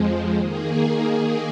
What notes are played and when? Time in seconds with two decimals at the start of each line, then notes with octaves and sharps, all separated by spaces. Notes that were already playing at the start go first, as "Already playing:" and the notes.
Already playing: F2 F3 G#3
0.36 D#3 A#3 G#4